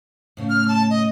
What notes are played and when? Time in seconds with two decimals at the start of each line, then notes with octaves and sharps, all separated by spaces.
0.37 A2 C#3 A3
0.50 F6
0.68 A5
0.90 D#5